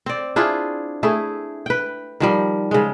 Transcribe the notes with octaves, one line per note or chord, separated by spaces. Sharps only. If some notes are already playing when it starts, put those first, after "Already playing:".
C4 D5
D4 E4 F4 G#4
A3 E4 G#4
B4 G5
D#3 F3 G3
C#3 G#3